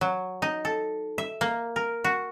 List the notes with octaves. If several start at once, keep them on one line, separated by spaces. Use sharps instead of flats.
F#3
D#4
A4
E5
A#3
A#4
F#4